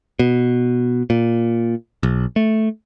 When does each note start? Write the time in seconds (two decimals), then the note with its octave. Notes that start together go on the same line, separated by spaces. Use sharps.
0.19 B2
1.10 A#2
2.03 B1
2.36 A3